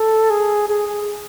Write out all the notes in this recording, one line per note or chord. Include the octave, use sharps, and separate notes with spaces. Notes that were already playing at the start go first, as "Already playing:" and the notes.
Already playing: A4
G#4
G#4